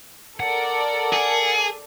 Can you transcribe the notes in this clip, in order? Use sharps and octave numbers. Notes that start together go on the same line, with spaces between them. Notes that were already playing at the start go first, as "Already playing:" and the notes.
A4 A#4 D5 F#5
G#4